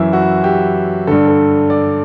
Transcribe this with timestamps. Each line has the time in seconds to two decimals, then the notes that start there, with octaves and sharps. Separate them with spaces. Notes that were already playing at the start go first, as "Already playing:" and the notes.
Already playing: F#2 E3 E4
0.13 F#4
0.44 G4
1.07 G2 D3 A4
1.28 A4
1.70 D5